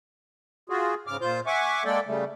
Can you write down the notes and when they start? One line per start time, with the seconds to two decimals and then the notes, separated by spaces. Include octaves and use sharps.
0.70 F4 F#4 G#4
1.07 G#2 C#3 D6 F6
1.21 A#2 F4 C5 G6
1.46 E5 F#5 G#5 C#6 D6
1.85 G#3 A#3 A4 D5 G5
2.07 C#3 G3 A3